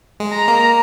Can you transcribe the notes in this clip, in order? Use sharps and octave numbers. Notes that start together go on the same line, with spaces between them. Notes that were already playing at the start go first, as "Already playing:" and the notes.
G#3
A#5
A#3